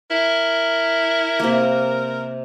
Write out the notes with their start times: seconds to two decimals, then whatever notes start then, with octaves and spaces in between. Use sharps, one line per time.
0.10 E4 A#4
1.40 C3 A#3